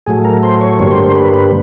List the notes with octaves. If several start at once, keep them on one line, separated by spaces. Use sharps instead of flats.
A2 F#3 A3 G#4
A#4
C5
C#5
G2 D3 G3 A#3 C#5
C5
C5
B4
B4